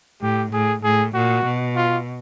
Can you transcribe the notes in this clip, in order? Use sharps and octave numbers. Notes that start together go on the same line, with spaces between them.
A2 G4
A2 G#4
A2 G#4
A#2 F#4
B2
F4